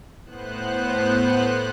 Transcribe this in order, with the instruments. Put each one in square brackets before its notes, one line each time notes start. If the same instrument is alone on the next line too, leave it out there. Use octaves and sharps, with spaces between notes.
[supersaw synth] A2 B3 C5 F#6